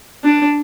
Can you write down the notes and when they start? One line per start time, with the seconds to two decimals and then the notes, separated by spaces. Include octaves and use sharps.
0.24 D4